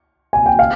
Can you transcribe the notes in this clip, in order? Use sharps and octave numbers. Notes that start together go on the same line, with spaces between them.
G#5
G5
F5